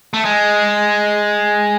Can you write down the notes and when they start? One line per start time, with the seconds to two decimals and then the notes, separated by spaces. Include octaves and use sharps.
0.14 A3
0.25 G#3